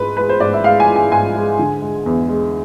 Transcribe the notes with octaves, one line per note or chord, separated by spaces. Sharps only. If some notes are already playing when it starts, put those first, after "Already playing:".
Already playing: G#2 G#3 B4
G#3 B4
C5
G#2 D5
E5
G#3 F5
G#5
G#3
G#5
G#2 G#5
G#3
D3
G#3
E2
G#3